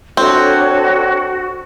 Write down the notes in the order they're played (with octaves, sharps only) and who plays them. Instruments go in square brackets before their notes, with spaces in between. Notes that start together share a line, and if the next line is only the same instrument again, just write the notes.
[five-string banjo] C4 [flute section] D4 A4 C#5 [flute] F#4